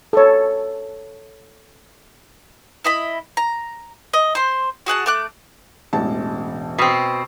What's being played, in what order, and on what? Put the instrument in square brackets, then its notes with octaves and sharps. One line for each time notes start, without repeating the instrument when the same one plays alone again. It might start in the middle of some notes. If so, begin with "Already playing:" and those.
[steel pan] A4 C#5
[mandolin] E4 D#5 B5
A#5
D#5
C5 C6
F#4 G#4 F#5 A5
A3 D6 F#6
[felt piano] E1 A1 A5
[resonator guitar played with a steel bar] B2 C4